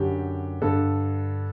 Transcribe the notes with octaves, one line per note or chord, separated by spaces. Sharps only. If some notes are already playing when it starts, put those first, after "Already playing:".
Already playing: F#2 D3 G4
G2 D3 A4